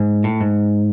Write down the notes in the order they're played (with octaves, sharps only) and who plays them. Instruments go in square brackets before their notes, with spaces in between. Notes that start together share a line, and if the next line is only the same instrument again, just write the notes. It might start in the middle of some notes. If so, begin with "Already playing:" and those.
Already playing: [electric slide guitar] G#2
A2
G#2